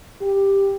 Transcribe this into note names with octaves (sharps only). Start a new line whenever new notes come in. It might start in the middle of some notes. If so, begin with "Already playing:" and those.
G4